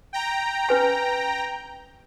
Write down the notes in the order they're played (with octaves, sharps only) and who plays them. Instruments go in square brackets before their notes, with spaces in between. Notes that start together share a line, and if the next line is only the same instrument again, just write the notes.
[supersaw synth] G5 A#5
[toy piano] C#4 B4 G#5